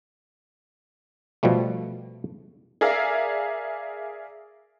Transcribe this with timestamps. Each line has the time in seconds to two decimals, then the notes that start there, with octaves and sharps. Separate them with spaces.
1.43 B2 F3 G3 A3
2.81 G#4 A#4 D5 E5 F5